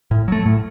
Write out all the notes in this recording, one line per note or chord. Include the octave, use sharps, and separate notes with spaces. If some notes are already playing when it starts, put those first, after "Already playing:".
A2
F#3 A3
A2